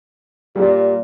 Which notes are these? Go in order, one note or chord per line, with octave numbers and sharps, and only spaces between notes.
A#2 G3